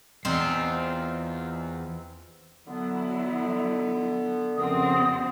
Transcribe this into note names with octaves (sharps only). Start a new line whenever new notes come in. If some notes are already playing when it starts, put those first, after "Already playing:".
E2 G2 C4 D#4 F4
D3 F#3 B3 E4
F2 C#3 C4 F#4 A#4 E5 D#6